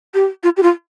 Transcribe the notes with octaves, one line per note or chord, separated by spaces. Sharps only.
G4
F4
G4
F4